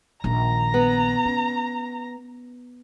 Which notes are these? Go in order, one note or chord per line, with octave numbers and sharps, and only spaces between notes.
A#1 D#3 A#5
B3
C#4